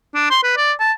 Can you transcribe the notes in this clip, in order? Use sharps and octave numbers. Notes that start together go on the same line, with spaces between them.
D4
C6
B4
D5
A5